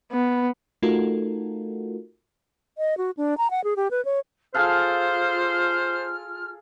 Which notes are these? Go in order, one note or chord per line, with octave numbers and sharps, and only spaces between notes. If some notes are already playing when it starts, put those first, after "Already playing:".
B3
A3 D#4 F4 F#4 A4 A#4
D#5
F#4
D4
A#5
F#5
G#4
G4
B4
C#5
F4 G#4 A4 C5 F5 F6